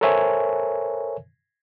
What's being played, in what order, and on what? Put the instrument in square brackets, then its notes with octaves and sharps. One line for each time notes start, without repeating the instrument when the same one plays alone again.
[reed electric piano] A4 A#4 C5 C#5 E5 G#5